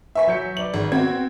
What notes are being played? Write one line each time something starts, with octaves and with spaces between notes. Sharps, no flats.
B4 E5 G#5 C#6 B6
F#3 G6 C#7
B4 D5 D6 F#7
G#1
B3 C4 F#4 G#6